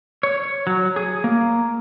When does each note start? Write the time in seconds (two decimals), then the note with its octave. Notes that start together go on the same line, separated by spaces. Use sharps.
0.23 C#5
0.67 F#3
0.96 G#4
1.24 A#3